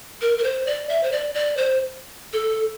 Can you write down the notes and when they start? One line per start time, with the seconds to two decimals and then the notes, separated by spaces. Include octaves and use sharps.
0.22 A#4
0.38 A#4
0.44 C5
0.67 D5
0.89 E5
1.03 C5
1.12 D5
1.34 D5
1.57 C5
2.33 A4